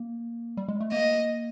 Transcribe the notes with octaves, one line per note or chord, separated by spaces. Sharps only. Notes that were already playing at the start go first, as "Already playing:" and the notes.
Already playing: A#3
G3
G#3
A3
A#3 D#5